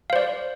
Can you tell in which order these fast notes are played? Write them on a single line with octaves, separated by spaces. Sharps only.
F5 C5 D5